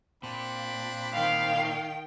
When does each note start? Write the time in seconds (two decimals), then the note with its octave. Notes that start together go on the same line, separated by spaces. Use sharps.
0.23 A#2 C4 D4 B5
1.13 D#3 F5 G5